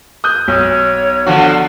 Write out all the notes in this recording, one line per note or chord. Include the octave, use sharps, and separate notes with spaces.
D#6 F#6 G6
B1 C#5
D3 F3 F#4